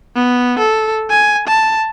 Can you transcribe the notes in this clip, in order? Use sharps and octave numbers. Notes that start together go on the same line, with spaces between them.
B3
A4
G#5
A5